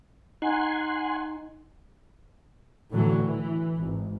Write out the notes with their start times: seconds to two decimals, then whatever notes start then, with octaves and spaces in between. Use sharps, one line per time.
0.42 D#4 F#5 G#5 C6
2.91 A2 D3 E3 F#3
3.24 E3
3.77 G#1